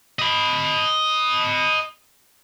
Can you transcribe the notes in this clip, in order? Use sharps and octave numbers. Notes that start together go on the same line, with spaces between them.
D#5 B5